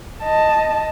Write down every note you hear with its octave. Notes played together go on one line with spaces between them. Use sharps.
D#5 A5